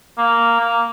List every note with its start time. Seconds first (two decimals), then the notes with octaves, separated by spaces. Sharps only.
0.18 A#3
0.60 A#3